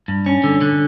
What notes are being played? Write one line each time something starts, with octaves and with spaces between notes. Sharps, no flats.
G2
C#4
D3
D3